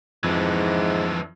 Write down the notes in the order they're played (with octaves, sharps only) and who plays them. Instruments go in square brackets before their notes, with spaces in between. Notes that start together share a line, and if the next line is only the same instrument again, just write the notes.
[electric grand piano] F2 [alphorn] G#2 [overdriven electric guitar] E3 D4 [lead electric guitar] F3 E4